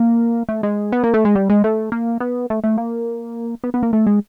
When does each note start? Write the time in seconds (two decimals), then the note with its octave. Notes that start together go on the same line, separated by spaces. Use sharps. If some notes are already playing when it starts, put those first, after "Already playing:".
Already playing: A#3
0.49 A3
0.63 G#3
0.92 B3
1.04 A#3
1.14 A3
1.25 G#3
1.35 G3
1.50 G#3
1.64 A3
1.92 A#3
2.20 B3
2.50 A3
2.64 A3
2.78 A#3
3.64 B3
3.74 B3
3.83 A#3
3.93 A3
4.07 G#3